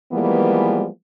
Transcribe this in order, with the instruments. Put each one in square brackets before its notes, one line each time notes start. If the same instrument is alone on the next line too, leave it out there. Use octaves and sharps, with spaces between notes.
[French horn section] E3 F3 G3 G#3 A#3 B3